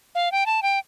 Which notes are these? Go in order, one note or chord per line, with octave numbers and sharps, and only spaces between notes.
F5
G5
A5
G5